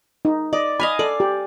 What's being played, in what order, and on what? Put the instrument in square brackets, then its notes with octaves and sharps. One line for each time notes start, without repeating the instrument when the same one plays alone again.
[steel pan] D#4
[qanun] D5 [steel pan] D#5
[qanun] D#5 F5 G#5 [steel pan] B5
[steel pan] A4 [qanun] D5
[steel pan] G4